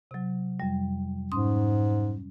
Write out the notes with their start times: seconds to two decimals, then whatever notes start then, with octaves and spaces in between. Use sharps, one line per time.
0.11 C3 F#3
0.60 F2 G3
1.32 G#2 C#4 C6 D#6